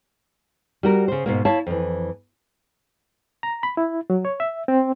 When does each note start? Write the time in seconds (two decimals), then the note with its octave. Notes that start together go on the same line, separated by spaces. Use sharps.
0.83 G3 F#4 A#4
1.08 C#3 C5
1.26 G#2 B2 A#3
1.45 E4 C#5 F5 A5
1.67 F2 E3
3.43 A#5
3.63 B5
3.77 E4
4.10 F#3
4.25 C#5
4.40 E5
4.68 C4